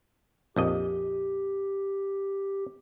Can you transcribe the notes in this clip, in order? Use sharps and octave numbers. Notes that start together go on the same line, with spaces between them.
A#1 F2 G4 D#5